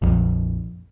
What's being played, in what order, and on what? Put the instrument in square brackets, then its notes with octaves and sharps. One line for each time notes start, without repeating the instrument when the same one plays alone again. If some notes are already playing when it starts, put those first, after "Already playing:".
[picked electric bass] A#1 F2